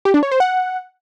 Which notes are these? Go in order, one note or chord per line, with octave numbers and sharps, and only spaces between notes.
G4
D4
C#5
C5
F#5